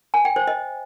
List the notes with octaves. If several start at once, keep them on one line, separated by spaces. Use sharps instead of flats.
G#5
G5
C5
D#5